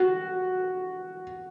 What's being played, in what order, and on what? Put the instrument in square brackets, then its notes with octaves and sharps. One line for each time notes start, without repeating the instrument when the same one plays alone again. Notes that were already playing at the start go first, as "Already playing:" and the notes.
Already playing: [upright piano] F#4